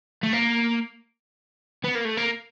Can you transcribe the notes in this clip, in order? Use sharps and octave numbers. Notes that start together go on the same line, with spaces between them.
A3
A#3
B3
A#3
A3
A#3